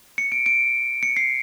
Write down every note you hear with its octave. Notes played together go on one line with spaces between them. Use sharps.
C#7
D7
D7
C#7
C7